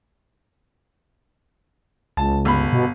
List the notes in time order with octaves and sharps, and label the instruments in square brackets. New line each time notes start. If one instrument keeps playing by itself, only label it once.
[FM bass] C#2 [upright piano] A5
[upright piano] G1 B5
[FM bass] B2